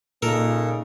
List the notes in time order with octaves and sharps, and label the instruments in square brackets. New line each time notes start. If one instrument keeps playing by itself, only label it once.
[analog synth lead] A#2 [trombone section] C#3 A#3 D#4 [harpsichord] A4 A#4